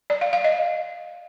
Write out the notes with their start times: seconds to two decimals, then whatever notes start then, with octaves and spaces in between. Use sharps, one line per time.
0.10 D5
0.21 F5
0.33 F5
0.44 D#5